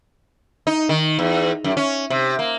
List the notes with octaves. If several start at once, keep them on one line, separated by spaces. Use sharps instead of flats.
D#4
D#3
E2
F#2
C#4
C3
A#3